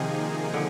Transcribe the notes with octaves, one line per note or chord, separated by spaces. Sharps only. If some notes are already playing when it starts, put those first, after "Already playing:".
Already playing: C3 D#3 F3 A#3 D#4 G#4
D3